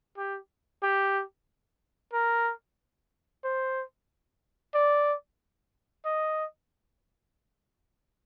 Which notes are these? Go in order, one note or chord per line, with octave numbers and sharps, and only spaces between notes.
G4
G4
A#4
C5
D5
D#5